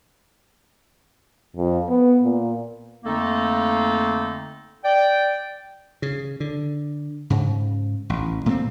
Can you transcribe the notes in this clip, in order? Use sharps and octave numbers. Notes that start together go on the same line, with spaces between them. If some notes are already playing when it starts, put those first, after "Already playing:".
F2
B3
A#2
F2 D3 A3 A#3 D#4 A4
D5 G5
C#3
D3
G#2 C#3
A1
A#2 A3 A#3 C4